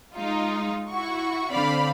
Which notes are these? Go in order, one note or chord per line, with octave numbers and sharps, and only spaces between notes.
G#3 D#4 F4
E4 F#4 C#6
D3 C4 D5 F5 B5